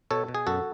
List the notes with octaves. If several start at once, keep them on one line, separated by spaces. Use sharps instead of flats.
B2 A4 C#5
B2
G#4
F#2 F#4 A4